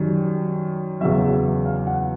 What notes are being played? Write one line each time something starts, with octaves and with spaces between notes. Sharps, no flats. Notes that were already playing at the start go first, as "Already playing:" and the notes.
Already playing: F#2 D#3 G3
E2 C#3 F#3 E5
F5
F#5